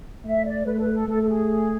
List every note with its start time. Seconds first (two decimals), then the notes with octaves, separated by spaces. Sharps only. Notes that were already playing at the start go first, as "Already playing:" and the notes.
0.25 A3 E5
0.46 D5
0.66 A3 B4
0.77 A4
0.80 B4
0.93 A4
1.08 A3 A4
1.22 A4
1.29 G#4